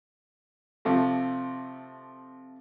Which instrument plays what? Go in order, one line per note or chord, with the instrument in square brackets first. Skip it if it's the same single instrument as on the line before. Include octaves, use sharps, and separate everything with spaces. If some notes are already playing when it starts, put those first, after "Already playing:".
[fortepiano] C3 F3 A3